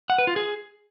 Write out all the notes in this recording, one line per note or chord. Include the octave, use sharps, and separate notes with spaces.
F#5
B4
F4
G#4